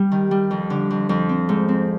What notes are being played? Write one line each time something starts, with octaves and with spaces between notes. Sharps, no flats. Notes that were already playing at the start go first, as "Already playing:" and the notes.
Already playing: G3
D#3
G3
F2
D3
F2
F2
C4
G#2
C4